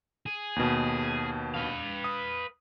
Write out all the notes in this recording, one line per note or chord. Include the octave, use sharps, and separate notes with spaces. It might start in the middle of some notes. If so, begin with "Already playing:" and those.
G#4
D#2 B2
B4 F5
D#6